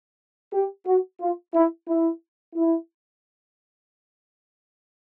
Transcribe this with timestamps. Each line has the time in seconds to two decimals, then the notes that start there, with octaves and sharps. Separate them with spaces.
0.53 G4
0.86 F#4
1.21 F4
1.54 E4
1.88 E4
2.55 E4